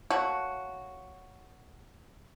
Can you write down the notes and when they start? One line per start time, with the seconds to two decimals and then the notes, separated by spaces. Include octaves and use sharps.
0.10 F#3 A3 A#3 F#4